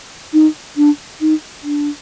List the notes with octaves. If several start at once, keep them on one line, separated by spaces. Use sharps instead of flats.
D#4
D4
D#4
D4